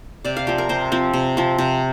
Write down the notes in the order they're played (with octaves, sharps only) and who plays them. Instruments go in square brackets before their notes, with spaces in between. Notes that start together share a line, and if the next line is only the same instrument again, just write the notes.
[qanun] C3 D5
F5
F3 C4 G4
A#4
C3 C5
F3 C4
C3
F3 C4
C3